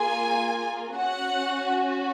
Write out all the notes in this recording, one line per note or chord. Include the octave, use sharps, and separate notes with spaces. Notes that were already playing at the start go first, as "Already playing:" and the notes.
Already playing: A#3 F4 G#4 G#5
C#4 F#4 F#5